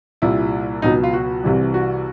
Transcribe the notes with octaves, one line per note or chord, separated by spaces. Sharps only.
C2 A#2 G3 E4
C#2 B2 F#3 D#4
F4
F#4
C2 C3 E3 G3
F#4